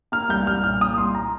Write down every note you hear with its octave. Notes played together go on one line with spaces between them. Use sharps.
A#3 F6
C2 G6
C2 F6
A#2 F6
A#3 D#6
C2 C6
A#5